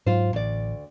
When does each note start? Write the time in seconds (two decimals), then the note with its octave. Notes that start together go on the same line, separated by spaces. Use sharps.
0.06 G#2 F#3 F4 C5
0.33 A1 D2 D5